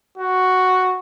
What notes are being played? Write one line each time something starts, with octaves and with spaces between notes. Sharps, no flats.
F#4